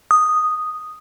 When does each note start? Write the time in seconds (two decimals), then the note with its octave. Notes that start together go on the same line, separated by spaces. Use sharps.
0.11 D#6